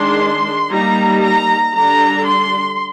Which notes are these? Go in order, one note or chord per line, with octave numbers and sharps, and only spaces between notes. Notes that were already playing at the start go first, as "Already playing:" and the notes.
Already playing: D#3 G#3 D4 C6
G3 A#3 D#4 A#5
A#5
D3 G3 D4 A#5
C6